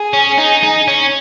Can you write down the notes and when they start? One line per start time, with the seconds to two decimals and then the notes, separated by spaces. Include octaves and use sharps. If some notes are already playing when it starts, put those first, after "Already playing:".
Already playing: G#4
0.13 C#4
0.38 D#4
0.63 D#4
0.88 C#4